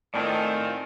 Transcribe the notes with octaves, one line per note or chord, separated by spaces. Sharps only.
A2 D#3 C4 F4 D5 G#5 A5